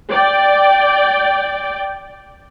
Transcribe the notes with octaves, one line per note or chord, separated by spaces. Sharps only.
D5 G5